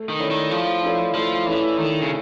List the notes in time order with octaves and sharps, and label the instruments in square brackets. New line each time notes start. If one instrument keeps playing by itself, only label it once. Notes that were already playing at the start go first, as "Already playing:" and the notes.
Already playing: [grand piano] A3
[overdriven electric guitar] D#3
[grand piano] C#4 E4 A4 D5
[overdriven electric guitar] D#3
[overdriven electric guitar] F3 [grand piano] A3
[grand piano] C#4 E4 A4 D5
[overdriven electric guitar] F3 [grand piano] A3
[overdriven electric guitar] E3 [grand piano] C#4 E4 A4 D5
[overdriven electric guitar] D#3 [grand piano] A3
[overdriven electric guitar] C#3